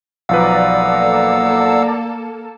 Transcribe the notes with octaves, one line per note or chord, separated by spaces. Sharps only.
B1 F3 B4 D5 F5 F#5 A#5 E6
A#3 A4